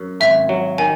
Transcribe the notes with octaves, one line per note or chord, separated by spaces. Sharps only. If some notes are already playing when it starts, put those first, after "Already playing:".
Already playing: F#2
G#1 E5
F#3
D#3 G#5